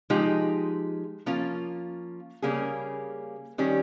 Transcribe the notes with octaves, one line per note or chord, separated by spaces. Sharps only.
F3 G#3 D#4 G4
F3 A#3 C#4 F4
C#3 G3 A#3 C#4 G#4
D#3 G3 C#4